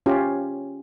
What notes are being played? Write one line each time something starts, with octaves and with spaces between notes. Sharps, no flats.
C#4 F4 G4